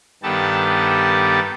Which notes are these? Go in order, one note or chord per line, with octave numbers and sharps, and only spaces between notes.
G2 D#3 B3 G4 A4 A5